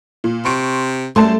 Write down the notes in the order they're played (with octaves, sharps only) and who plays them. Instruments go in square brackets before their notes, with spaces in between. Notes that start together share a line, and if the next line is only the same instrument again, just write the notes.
[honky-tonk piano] A#2
[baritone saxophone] C3 [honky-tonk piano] C6 C#6 D7
[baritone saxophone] F#2 [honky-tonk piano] G3 A5 C6 [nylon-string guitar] A3